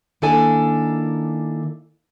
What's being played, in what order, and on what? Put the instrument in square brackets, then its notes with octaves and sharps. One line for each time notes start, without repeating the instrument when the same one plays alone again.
[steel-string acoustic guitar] D#3 A#3 D4 E4 A4 G#5